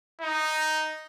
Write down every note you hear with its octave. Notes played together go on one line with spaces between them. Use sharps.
D#4